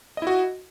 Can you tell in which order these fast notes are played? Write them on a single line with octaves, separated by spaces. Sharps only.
D#5 E4 F#4